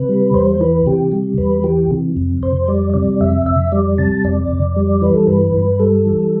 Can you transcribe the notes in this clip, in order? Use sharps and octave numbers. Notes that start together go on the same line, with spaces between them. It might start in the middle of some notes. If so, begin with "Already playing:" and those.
Already playing: C3 B4
G3
E2 C5
C5
E3 B4
C3 G4
G3
E2 B4
E3 G4
C3
F2
F2 C5
G3 D5
C3 D5
F2 E5
F2 E5
G3 D5
C3 A5
F2 D5
F2
G3
E3 B4
A4
G2 B4
G2
G3 A4
E3